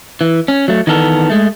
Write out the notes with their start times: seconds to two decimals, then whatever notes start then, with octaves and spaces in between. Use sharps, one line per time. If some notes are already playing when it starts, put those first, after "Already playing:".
0.21 E3
0.48 C#4
0.68 F#3 A3
0.87 D#3 E3 B3 A4 A#4
1.30 G#3 A3